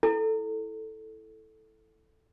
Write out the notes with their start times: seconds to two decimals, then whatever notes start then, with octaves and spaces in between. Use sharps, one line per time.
0.03 E4 A4